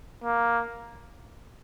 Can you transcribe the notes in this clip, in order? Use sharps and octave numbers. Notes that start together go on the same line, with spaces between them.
A#3